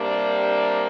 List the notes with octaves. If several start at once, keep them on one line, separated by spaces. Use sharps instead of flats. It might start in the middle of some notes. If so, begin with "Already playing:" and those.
Already playing: C3 G3 A#3 D4